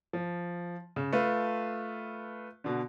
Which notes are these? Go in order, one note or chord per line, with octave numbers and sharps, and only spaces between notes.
F3
C#3
A3 F4 B4 F5
B2 D3